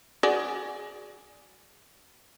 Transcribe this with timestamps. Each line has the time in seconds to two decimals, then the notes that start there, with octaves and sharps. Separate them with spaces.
0.23 F#4 G#4 D5